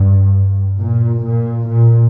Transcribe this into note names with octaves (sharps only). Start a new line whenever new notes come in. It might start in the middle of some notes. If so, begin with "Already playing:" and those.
Already playing: G2
A#2
A#2
A#2